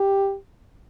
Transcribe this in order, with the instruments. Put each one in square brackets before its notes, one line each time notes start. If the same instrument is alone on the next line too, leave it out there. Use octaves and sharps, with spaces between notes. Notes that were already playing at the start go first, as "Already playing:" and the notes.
Already playing: [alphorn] G4